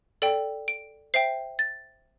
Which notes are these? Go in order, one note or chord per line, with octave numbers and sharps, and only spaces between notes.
A4 D5 G5
D7
C5 E5 G5 C7
A6